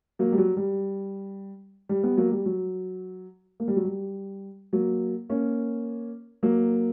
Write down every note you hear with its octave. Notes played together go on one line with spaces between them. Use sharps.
F#3 A#3
G3
F#3
G3
G3
G3 B3
F#3 A#3
G3
F#3
A#3
G3
F#3
G3
F#3 A#3
A#3 C#4
F#3 A#3